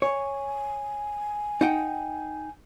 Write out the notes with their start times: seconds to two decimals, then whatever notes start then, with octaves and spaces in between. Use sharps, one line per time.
0.02 C#5 G#5
1.61 D#4 F#5 G5